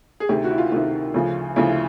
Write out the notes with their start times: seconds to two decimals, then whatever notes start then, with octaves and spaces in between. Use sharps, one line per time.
0.20 G#4
0.29 D2 C3 D#3 G4
0.44 F#4
0.51 E4
0.58 F4
0.72 D2 C3 D#3 F4
1.14 D2 C#3 F3
1.56 D2 C#3 F3 E4